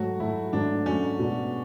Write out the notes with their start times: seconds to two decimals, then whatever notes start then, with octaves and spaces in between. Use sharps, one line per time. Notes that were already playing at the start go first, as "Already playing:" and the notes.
Already playing: G#2 F#3 A3 F#4
0.19 G#2 F#3 A3 E4
0.53 G#2 F#3 A3 D4
0.86 G#2 F#3 A3 C#4
1.19 B2 G#3 B3 D4